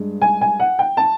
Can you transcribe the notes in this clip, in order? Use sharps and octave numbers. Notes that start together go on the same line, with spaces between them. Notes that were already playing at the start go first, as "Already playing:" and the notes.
Already playing: G2 G#3
G#5
G#5
F#5
G5
A5